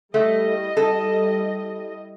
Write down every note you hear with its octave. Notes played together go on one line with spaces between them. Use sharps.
G3 A3 E4 D#5
A4